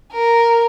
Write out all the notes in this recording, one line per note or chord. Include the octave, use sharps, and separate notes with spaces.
A#4